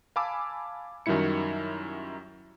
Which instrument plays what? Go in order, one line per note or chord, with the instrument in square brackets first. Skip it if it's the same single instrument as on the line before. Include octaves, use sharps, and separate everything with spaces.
[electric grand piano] F5 G#5 A5 B5 D6 E6
F#2 D#3 F#3 G3 E4 C#7